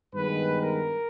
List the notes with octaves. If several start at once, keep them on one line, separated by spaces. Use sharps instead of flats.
G2 D#3 G#3 B3 B4
A#4